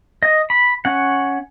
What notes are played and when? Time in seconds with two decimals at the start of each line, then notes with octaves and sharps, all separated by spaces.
0.23 D#5
0.50 B5
0.85 C#4 F#5